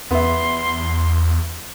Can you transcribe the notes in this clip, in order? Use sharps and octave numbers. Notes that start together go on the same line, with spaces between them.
E2 B3 E5 C6